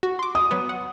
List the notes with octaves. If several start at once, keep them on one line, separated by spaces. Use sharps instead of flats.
F#4
C6 D6
D#6
F#3 B3
F#5